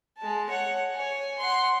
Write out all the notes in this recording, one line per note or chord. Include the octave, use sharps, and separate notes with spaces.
G#3 A5
C#5 F#5
C#5 G#5
F#5 C6